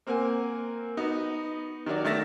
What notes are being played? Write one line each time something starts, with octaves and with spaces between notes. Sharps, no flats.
A#3 C4 A#4 F#5 G#5
B3 D#4 F#4
D#3 F#3 F#4 D5
D#3 A3 E5 A6 A#6 E7